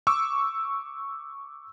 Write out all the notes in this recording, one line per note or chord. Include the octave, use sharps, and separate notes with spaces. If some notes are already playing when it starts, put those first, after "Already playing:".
C#6 D6 E6